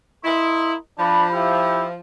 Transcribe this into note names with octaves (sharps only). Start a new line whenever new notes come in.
A#3 E4 D#5 C6
F3 D4 B5
E4 G4